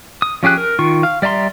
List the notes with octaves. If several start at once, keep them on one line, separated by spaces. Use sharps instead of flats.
D#6
F3 C#4 G4 G#4 F#6
A#4
D#3 F4 C#6
F5
G3 D5 E5 A#5 C6